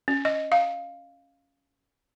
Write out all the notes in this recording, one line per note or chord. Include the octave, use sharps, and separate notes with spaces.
C#4
D#5
F5